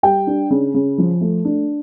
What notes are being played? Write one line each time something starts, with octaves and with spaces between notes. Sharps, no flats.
G3 G5
D4
C#3
C#3
F3
A3
D4